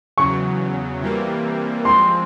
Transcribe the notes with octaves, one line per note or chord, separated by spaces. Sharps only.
E2 C#3 F#3 C#6
C3 E3 G3 A#3
F3 G#3 C4 C6